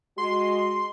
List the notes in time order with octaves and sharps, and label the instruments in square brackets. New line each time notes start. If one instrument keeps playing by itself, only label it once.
[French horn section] G#3 F#4 [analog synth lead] C6